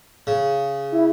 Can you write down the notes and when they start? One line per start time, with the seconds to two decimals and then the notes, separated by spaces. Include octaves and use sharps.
0.27 C#3
0.92 E4